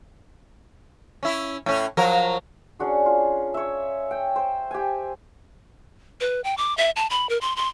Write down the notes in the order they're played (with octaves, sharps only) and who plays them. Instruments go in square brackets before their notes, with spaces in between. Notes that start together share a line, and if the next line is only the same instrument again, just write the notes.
[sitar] C#4 E4
A2 C#4
F3 F#3 A#4
[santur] C#4 D4 F#4 G#4
F4
C#5 E5
G5
C5
G4 G#5
[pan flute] B4
G5
D6
E5
A5
B5
A#4
C6
C6